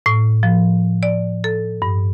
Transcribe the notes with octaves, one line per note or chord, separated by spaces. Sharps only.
A2
F3
D5
A4
G2